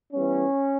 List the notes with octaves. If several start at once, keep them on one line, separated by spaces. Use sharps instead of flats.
E3 G3 B3 C#4